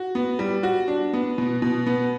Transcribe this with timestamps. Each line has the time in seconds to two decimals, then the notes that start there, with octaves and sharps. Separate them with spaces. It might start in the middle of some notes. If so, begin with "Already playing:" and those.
Already playing: F#4
0.15 B3
0.39 G3
0.63 F#4
0.88 D4
1.13 B3
1.38 B2
1.62 B2
1.87 B3